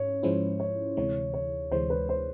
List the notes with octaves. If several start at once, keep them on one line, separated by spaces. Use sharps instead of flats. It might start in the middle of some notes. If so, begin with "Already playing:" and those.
Already playing: G#2 C#4 C#5
G#2 F3 G#3 C#4 E4 C5
C#5
D2 C3 E3 G#3 C#5
C#5
D2 C3 E3 G#3 C5
B4
C5